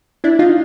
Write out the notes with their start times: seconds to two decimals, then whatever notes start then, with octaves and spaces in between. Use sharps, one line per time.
0.24 D4 E4
0.39 D#4 F4